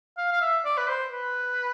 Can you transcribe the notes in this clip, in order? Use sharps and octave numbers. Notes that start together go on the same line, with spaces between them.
F5
F5
E5
D5
B4
C5
B4